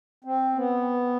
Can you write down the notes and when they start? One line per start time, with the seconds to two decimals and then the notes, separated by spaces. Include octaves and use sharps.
0.24 C4
0.55 B3